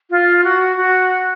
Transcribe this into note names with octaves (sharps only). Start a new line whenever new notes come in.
F4
F#4
F#4